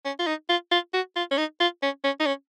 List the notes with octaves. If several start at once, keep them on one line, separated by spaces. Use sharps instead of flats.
C#4
F4
D#4
F4
F4
F#4
F4
C#4
D#4
F4
C#4
C#4
D#4
C#4